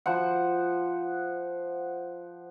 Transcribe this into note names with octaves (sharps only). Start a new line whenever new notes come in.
F3 C5 F#5